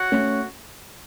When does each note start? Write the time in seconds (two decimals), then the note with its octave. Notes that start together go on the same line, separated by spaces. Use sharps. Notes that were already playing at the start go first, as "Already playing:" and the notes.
Already playing: F#4 C#5 F#5
0.12 A3 C#4